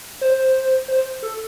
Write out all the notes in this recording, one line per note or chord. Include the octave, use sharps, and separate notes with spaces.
C5
C5
A4